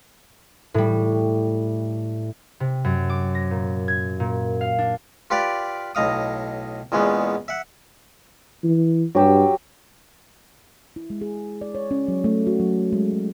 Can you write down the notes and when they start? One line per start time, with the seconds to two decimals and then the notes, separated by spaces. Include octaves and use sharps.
0.74 A2 G3
2.60 C3
2.84 F#2
3.10 D6
3.35 A#6
3.51 A#2
3.88 G#6
4.20 A#2
4.61 F5
4.78 D4
5.30 F4 G4 B4 D5 F5
5.95 B1 A2 D#5 F5 D#6
6.92 E2 A#2 G#3 B3 C#4
7.48 E5 F#5
8.64 E3
9.15 G2 F#3 G4 E6
10.96 E4
11.10 G#3
11.21 G#4
11.61 D5
11.75 C#5
11.91 C#4
12.08 F#3
12.24 A3
12.47 F#4
12.60 F#3
12.92 G#3
13.13 G#3